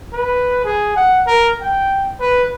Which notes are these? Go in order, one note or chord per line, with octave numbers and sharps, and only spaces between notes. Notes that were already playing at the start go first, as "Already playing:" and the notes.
B4
G#4
F#5
A#4
G5
B4